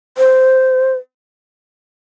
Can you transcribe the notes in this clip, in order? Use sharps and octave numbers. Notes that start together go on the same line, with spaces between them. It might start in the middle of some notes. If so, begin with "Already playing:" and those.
C5